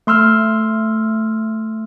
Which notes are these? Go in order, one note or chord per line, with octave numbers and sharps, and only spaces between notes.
A3 C6 E6 F6